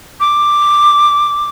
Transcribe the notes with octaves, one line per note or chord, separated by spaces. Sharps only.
D6